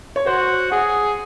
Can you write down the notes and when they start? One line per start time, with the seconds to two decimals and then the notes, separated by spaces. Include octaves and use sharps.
0.16 C#5
0.26 F#4 C5
0.72 G#4 F#5